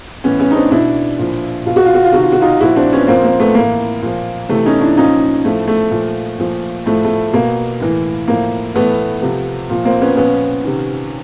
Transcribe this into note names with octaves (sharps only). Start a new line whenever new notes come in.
A2 E3 B3 C#4
B3 C#4
D#4
C4 D4
B2 D4 E4
A#2 F3
B2 F4
F#4
F4
F#4
F4
C3 D#3 F#4
F4
F#4
D#4 F4
A#2 F3 E4 F#4
C4 D4
B3 C#4
A#2 F3 A#3 C4
A#3
A3 B3
A2 E3 A#3
A#2 F3
C3 E3 A3
C#4 D#4
D4 E4
A#2 F3 C#4 D#4
A2 F3 A3
A3
A#2 F3
A#2 F3
A2 F3 A3
A3
B2 A#3
A2 E3
A2 F3 A#3
A2 E3 A3 B3
C3 F3
A#2 F3
A#3 C4
B3 C#4
A#2 F3 B3 C#4
C3 D#3